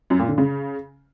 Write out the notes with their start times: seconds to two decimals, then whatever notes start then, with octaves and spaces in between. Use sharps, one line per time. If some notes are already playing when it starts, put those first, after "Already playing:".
0.10 F#2
0.19 A#2
0.29 D3
0.38 C#3